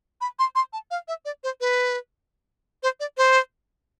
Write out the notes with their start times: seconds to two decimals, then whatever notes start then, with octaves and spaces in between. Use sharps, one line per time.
0.21 B5
0.39 C6
0.55 C6
0.73 A5
0.91 F5
1.08 E5
1.25 D5
1.44 C5
1.61 B4
2.83 C5
3.00 D5
3.17 C5